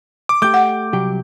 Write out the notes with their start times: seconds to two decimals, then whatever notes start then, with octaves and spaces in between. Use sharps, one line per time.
0.29 D6
0.42 A3 G4 D6 G6
0.54 F#5
0.93 C2 F#3 G4